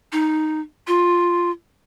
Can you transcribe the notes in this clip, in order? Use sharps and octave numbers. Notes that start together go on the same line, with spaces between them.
D#4
F4